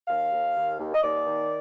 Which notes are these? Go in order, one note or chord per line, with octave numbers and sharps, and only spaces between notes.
D#2 F5
D#2
D#2
D#2
D#5
D#2 D5
D#3